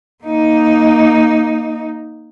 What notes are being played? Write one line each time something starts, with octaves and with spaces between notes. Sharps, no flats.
A#3 D#4